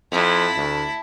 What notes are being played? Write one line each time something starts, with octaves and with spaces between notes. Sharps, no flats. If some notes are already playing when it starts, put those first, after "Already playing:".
F2 E4 A5
D2